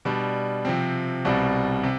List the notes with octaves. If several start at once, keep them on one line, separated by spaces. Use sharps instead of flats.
B2 G3 D4
C3 F3 C4
C2 B2 G3 C4
C3